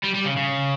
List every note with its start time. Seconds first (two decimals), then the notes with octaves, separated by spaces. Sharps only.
0.03 G3
0.14 G3
0.25 C#3
0.37 C#3